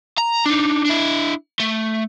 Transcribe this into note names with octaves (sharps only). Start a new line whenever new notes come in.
A#5
D4 D#4
D4 E4
A3